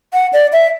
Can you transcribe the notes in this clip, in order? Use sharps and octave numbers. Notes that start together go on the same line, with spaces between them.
F#5
D5
E5